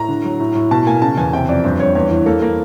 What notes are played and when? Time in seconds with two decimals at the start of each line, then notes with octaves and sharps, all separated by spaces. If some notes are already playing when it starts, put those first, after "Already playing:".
Already playing: A2 A#5
0.09 D3
0.24 F#3
0.40 A2
0.55 A2
0.71 B2 A5
0.86 A#3 G#5
1.02 C#3 A5
1.17 E2 G#5
1.33 C3 G5
1.49 F2 D5
1.64 G2 C5
1.80 G2 C#5
1.95 E2 C#5
2.11 E3
2.26 A#3 A4
2.42 A#3